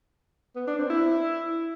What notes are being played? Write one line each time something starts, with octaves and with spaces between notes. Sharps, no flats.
B3
D4
C4
E4